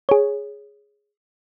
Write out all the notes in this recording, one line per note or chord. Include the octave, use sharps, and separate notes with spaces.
G#4 C#5